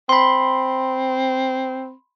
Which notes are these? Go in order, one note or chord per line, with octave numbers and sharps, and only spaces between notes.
C4 B5 C6